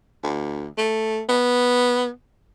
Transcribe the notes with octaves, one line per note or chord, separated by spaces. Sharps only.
D2
A3
B3